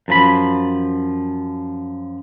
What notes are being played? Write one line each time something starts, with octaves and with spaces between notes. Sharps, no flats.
F#2 F3 B5